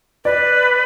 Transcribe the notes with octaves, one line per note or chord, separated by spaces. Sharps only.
B4 D5